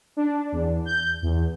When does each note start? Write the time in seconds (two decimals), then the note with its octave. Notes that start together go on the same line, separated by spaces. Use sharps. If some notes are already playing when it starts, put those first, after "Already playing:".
0.17 D4
0.52 E2
0.85 G6
1.22 E2